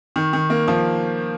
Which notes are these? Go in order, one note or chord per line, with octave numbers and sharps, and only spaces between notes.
D#3
D#3
A#3
F3